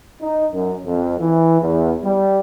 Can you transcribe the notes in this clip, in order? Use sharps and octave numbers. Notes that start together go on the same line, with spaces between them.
D#4
F#2
F2
E3
E2
G3